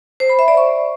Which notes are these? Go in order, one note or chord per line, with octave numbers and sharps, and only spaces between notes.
C5
B5
E5
D5
C#6